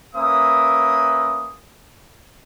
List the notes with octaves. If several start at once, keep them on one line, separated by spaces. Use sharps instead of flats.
A#3 C#4 B4 E5 D#6